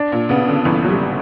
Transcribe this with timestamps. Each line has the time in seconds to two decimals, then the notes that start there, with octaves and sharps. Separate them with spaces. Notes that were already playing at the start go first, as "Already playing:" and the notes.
Already playing: D4
0.12 A#2
0.29 C#3 B3
0.48 D3
0.65 G1 E3
0.85 F#3
0.90 G3